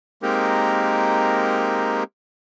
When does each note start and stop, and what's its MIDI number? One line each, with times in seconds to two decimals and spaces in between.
0.23 2.04 56
0.23 2.04 58
0.23 2.04 60
0.23 2.04 63
0.23 2.04 67
0.23 2.04 70